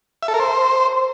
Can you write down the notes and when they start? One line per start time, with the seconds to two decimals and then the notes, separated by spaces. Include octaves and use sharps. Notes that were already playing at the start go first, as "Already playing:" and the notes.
0.23 E5
0.28 A4
0.34 A#4
0.40 C5